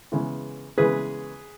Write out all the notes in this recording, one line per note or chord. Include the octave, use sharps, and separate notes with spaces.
C#3 E3 G#3 B3
C#3 E3 G#3 B3 G#4 B4